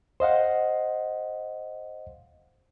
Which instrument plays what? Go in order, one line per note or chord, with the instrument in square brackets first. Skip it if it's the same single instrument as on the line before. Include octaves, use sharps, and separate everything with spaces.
[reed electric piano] C5 D#5 F5 F#5